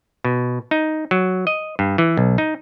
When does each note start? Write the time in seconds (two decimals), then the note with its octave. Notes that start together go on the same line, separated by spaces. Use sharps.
0.25 B2
0.71 D#4
1.11 F#3
1.47 D#5
1.79 G2
1.98 E3
2.17 B1
2.38 D#4